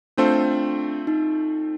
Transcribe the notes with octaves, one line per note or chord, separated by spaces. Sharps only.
A3 C4 D4 F4 A4 C5
D#4